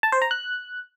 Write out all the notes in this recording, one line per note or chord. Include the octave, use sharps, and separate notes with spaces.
A5
C5
A#5
F#6